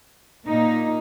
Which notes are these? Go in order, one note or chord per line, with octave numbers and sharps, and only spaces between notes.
A#2 A#3 D#4